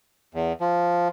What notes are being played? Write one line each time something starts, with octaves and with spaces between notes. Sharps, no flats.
E2
F3